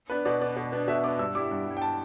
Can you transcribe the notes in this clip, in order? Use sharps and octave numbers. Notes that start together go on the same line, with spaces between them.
B3 D4 B4
B2 D5
B3 D4 D5
B2
B3 D4
B2 E5
B3 D4 D6
G2 E6
G3 E4 D6
G2
G3 E4
G5
A5